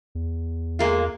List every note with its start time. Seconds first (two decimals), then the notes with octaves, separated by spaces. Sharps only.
0.15 E2
0.79 G#3 A#3 F4